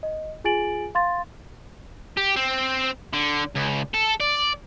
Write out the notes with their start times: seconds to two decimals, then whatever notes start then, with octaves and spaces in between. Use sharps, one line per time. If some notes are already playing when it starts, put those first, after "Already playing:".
0.03 D#5
0.44 F4 G#4 G#5 A6 D7 F#7
0.95 F5 C6 A6
2.17 G4
2.36 C4
3.13 D3
3.56 C#2
3.94 A4
4.20 D5